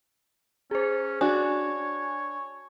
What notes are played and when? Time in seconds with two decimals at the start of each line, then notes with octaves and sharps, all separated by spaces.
0.71 C#4 G#4 C5
1.21 D4 F#4 C#5 G#5